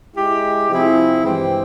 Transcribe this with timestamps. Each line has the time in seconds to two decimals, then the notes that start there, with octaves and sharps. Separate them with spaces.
0.15 G#3 E4 G4
0.69 C3 F3 C4 E4 G#4
1.23 G2 E3 G#3 C4 G4